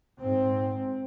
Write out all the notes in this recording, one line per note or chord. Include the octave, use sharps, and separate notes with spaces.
G#2 C4